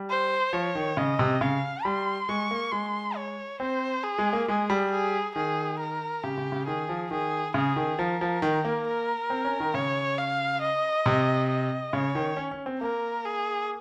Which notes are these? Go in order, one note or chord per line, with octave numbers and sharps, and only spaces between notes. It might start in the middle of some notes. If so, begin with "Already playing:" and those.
Already playing: G3
C5
F3 C#5
D#3
C#3 D#5
C3
C#3 F5
G3 C6
G#3 C#6
A#3
G#3 C6
C#5
C4 C5
G#4
G#3
A#3
G#3 G#4
G3
G#4
D#3 G#4
A#4
C#3 G4
C#3
C#3
D#3 G#4
F3
D#3 G#4
C#3 G#4
D#3
F3 A#4
F3
D#3
A#3
A#4
C4
C#4
D#3
C#3 C#5
F5
D#5
C3
D#5
C#3 C#5
D#3
C#4
C#4
C4
A#3 A#4
G#4